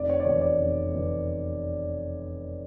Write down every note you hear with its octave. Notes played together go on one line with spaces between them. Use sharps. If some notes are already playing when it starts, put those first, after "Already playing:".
Already playing: F1 D5
C#5
D5
E2 B2 C#5
D5
F1
E2 B2